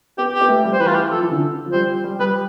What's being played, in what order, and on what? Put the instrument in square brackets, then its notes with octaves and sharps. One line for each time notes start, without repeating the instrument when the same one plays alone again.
[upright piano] B3 [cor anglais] G4
[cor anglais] G4
[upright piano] B3
A3
G3
[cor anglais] C5
[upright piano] E3 [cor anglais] B4
[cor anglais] F4
G4
[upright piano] F3 [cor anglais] A4
[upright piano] E3
D3
F3
[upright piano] G3 [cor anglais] C5
[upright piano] G3
[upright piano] G3 [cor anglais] B4